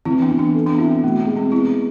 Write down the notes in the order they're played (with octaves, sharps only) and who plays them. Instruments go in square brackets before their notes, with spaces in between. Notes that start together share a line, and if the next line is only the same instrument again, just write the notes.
[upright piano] E3 [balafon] C4 E4
[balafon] B3 D4
[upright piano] E3
[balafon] B3 D4
[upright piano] A4
[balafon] B3 D4
[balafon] C4 [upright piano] E4
[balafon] B3
[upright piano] B2 [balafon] A3
[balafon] B3
[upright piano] G#3
[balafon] C4
[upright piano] B3 [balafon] C4 E4